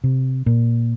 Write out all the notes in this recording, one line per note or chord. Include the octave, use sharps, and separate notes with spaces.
C3
A#2